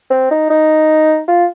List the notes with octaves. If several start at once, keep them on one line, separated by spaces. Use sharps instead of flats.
C4
D#4
D#4
F4